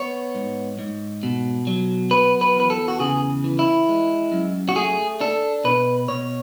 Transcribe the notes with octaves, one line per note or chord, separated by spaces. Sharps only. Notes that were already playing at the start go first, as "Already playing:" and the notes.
Already playing: B3 C#5
G#2
G#2
B2
F#3
B3 B4
B4
E2 B4
A4
F#4
C#3 G#4
E3
E4
G#3
F#2
F#4
A3 G#4
D4 A4
B2 B4
B2 C#5